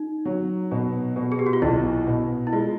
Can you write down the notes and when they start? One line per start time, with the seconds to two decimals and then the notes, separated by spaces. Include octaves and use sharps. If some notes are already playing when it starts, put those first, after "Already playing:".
Already playing: D#4
0.25 F#3
0.71 B2
1.16 B2
1.32 G#4
1.39 G4
1.46 F#4
1.53 F4
1.62 B1 E4
2.07 B2
2.47 E4
2.52 G#3 F4